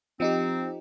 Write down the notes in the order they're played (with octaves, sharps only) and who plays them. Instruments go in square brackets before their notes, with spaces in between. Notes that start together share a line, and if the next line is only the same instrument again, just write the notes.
[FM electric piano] F3 D#4 G4 [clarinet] C4